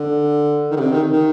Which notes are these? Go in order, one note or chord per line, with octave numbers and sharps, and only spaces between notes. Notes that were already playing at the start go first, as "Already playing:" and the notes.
Already playing: D3
D#3
D3
C3
D#3
D#3